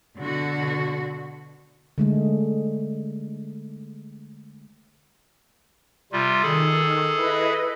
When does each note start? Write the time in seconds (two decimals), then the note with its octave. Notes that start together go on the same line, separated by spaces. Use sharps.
0.19 B2 D3 F#4
1.98 D3 G#3 A3
6.12 C3 G3 F4
6.43 D#3 G#4 A4
7.15 E4 B4 D#5